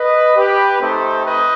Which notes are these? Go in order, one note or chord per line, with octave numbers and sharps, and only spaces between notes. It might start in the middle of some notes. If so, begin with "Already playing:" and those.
Already playing: B4 D#5
G4 B4
A3 C4 D#4 G4 A4 C5
B4 D#5